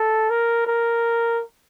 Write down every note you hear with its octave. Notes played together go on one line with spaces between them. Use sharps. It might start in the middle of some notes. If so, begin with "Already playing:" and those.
Already playing: A4
A#4
A#4